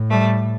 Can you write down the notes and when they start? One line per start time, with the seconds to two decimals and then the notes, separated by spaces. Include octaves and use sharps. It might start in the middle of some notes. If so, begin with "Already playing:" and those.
Already playing: A2
0.10 G3 A3